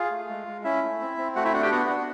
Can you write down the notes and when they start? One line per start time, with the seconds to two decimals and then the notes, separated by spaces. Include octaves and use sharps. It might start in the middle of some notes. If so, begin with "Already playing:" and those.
Already playing: F4 G#4 F5
0.11 A3
0.29 G#3
0.47 G#3
0.64 C#4 E4 E5
0.82 A3
1.01 C4
1.18 C4
1.36 A3 F#4 F#5
1.45 E4 E5
1.53 D4 F#4 F#5
1.62 G4 G5
1.71 B3 F#4 F#5
1.90 D4